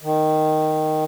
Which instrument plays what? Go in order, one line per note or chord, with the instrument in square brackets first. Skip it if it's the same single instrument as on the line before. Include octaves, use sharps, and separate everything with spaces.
[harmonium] D#3